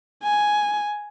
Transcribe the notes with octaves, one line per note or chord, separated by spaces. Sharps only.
G#5